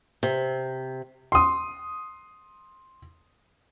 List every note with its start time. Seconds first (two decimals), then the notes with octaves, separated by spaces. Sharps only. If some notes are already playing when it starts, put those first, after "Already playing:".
0.23 C3
1.32 C6 D#6